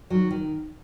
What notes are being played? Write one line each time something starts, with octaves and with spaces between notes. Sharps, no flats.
D#3 F#3
D#3